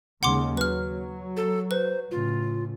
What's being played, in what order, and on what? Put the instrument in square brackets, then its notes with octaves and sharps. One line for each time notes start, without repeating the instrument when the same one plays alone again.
[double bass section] D#2 C#3 G#3 [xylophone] F#5 C6 D6
[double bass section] F#3 [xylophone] B4 F6
[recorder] A4
[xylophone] B4 [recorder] C5
[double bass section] A2 C#3 [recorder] F4